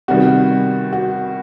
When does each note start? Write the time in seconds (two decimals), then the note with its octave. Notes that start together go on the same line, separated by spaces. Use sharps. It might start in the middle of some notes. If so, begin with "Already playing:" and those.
0.08 C3 D#3 G3 B3 F#4
0.93 F#4